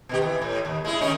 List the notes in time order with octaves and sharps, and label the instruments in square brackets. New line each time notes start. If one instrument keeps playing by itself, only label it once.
[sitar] B2 D#3 G4
E3
A2
D#2
G#3 E4
D#3 C#4 D#4